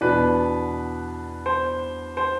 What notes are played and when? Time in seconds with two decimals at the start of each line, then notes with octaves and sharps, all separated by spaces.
0.01 E2 B2 B3 D4 B4
1.46 C5
2.17 C5